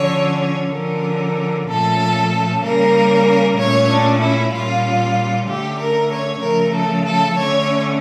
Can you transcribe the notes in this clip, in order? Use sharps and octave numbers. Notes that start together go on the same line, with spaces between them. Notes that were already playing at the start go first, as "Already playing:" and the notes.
Already playing: D3 F3 C#4 C#5
D3 F3 C#4 A#4
A#2 F3 A3 C#4 A4
C#3 G3 A#3 C#4 A#4
A#2 A3 C#4 C#5
D4
E4
A#2 G3 C#4 F4
D3 A3 C#4 G4
A#4
C#5
C#3 F3 A3 A#4
A4
A4
D3 A3 C#4 C#5